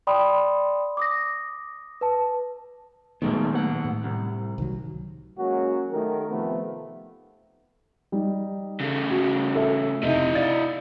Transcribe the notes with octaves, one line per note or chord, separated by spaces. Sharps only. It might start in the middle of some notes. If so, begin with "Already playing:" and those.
D5 G5 B5 C6 D#6
D6 D#6 A#6
B4 A5
A#2 D#3 F#3 G#3 A3 B3
D#2 F#5
A2
C2
C2 D#3 F#3
F#3 G#3 A#3 C#4 F#4
D#3 A3 G4 A#4
C3 D#3 F3 A3 B3
G3 D#4
C#3 A3
F#4
A4 E5
F1 D#4 E4 D#5 E5
D5 F5 A6